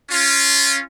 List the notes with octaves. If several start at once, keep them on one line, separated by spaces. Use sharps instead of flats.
C#4 F4